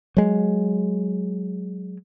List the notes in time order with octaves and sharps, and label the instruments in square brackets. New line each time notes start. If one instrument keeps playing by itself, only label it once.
[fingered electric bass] F#3 G#3